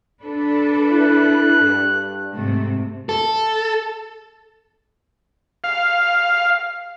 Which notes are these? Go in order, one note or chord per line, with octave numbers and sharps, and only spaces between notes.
D4 A4 B4
E4 F#6
G2
G#2 C3 A3
A4
F5